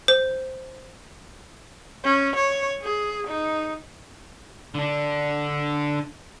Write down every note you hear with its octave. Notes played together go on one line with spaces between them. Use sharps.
C5
C#4
C#5
G#4
D#4
D3 D4